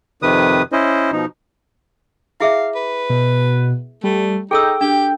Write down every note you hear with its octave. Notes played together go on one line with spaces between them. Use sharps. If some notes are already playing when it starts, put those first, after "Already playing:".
F2 C3 D#3 B4 D#6
C#4 E4 C5 D#5
B2 F3 D#4
E4 G#4 E5 F5
B4
B2
G3 A3
D#4 G#4 A4 G5 E6
D4 G4